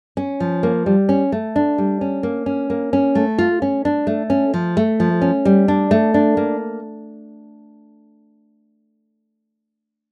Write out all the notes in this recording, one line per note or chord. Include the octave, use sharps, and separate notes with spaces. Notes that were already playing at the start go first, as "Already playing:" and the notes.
C#4
F3
A#3
G3
C#4
A3
D4
G3
C#4
A#3
C#4
A#3
C#4
A3
F4
C#4
D4
A3
C#4
F3
A3
F3
C#4
G3
D4
A3
D4
A#3